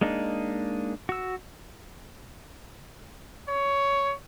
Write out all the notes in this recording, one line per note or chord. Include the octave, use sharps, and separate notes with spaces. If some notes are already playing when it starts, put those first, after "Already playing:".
G#3 A#3 D4 D#4
F#4 E6
C#5